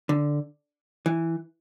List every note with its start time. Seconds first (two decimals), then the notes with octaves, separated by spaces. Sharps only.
0.09 D3
1.06 E3